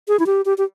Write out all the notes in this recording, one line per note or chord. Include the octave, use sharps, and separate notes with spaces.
G#4
E4
G4
G4
G4